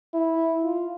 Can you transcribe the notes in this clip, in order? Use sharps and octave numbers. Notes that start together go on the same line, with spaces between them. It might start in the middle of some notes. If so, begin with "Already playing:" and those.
E4
F4